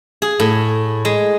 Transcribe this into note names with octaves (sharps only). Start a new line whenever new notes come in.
G#4
A2
G#3